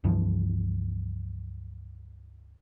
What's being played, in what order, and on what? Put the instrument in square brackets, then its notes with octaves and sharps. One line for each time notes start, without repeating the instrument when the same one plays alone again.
[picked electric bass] C#2 G2 E3 F3